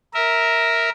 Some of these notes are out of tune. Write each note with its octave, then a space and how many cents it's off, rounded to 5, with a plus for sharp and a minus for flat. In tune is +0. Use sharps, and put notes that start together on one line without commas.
A#4 +0 E5 -15